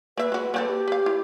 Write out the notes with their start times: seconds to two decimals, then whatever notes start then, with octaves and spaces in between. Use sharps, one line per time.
0.17 A#3 B4 E5
0.32 G#3 F#4
0.54 A#3 C4 A4
0.68 G4
0.88 B4 F5
1.06 E4